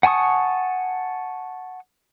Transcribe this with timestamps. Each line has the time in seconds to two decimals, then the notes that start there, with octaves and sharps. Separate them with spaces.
0.03 F#5 G#5 A5 C#6 D#6